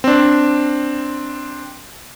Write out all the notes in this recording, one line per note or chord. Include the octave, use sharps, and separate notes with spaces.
C4 D4